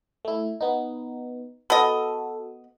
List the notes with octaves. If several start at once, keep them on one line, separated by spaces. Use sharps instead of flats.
A3 E4
B3 D#4
B3 F#4 A4 D#5